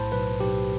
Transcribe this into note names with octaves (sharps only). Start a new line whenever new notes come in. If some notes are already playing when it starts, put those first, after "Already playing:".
Already playing: B1 A2 C5 A5 B5
B1 B4
B1 G4